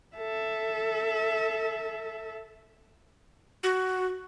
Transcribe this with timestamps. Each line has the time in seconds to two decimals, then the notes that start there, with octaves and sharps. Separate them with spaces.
0.17 A4 E5
3.63 F#4